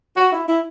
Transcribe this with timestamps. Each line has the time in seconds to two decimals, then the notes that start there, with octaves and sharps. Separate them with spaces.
0.16 F#4
0.32 E4
0.48 E4